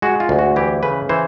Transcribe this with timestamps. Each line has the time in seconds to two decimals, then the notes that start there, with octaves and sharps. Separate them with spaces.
0.02 G#3 F#4
0.20 F4
0.29 D2
0.39 F#4
0.56 E3 G4
0.83 C#3 B4
1.09 E3 C5